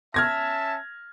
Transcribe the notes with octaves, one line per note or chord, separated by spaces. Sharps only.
C#4 E5 A5 F6 G#6 A#6